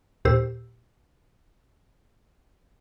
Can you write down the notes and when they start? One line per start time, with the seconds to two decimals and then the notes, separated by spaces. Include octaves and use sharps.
0.25 D#2 A#2 G4 C5 E6